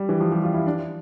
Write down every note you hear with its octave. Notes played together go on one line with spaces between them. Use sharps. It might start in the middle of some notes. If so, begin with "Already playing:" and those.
Already playing: G3
E3
F3
G3
F4
E4
D4